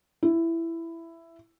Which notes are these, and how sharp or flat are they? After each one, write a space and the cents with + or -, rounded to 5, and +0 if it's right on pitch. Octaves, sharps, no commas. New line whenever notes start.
E4 +10